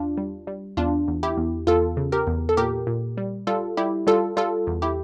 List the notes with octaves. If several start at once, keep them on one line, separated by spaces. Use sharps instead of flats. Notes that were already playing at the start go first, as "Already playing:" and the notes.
Already playing: E2 D4 F4
G3
G3
E2 D4 F4
E2
E4 G4
E2
E2 F4 A4
C#3
G4 A#4
E2
A4
A#2 G4 A#4
A#2
G3
G3 F4 A4
G3 E4 G4
G3 F4 A4
G3 F4 A4
E2
E4 G4